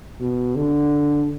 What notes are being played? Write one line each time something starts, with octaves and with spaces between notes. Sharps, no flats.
B2
D3